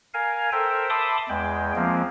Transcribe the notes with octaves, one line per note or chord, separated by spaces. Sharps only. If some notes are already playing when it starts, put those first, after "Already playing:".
A#4 F5 G#5
A4 A#4 C5 E5 G5
E5 A5 B5 C6 D6 D#6
E2 G#3 G5
F3 G#3 A#3 C4